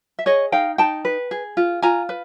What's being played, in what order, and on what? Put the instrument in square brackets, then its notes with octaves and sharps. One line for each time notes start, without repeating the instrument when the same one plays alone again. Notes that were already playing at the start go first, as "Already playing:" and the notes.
[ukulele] E5
G#4 C#5 D#5
D#4 F5 G5
D#4 G5 A5
B4
G#4
F4
F4 G#5 A#5
B4